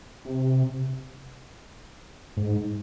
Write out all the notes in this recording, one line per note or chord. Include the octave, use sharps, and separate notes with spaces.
C3
G#2